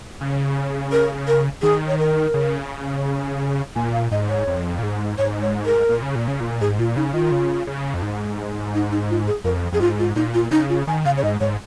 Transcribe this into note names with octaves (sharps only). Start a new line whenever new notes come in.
C#3
A#4
A#4
D#3 G#4
C#5
A#4
C#3
A#2 G#5
F5
G#2 D#5
C#5
F2
A#2
G#2
G#2 C#5
C#5
A#4
A#2
C#3
A#2
C#3
A#2
G#2 G#4
A#2 F4
C#3 D#4
D#3 F4
C#3
C#3
F2
G#2
D#4
D#4
F4
G#4
F2 A#4
F2 G#4
G#2 F4
F4
A#2 D#4
F4
C#3 D#4
F4
D#3 G#5
C#3 F5
C#5
G#2 D#5
G#2 C#5